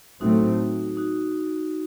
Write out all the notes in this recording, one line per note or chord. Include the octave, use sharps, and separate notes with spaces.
A2 F#3 A3 C4 D#4 F#4
D#4 F#4